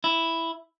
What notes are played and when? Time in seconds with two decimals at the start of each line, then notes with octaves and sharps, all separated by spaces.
0.04 E4